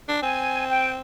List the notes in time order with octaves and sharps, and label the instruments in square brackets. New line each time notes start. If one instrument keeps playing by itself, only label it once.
[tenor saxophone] D4
[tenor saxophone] C4 [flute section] G#5
[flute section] G5